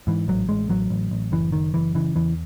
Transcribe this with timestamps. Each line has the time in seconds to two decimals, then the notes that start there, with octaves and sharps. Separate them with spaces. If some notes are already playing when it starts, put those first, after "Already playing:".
0.07 G#2 E3
0.28 A1 F#3
0.49 A1 G#3
0.69 A1 F#3
0.90 A1
1.11 A1
1.32 F#1 E3
1.52 F#1 D#3
1.74 F#1 E3
1.95 C#3 E3
2.15 E2 E3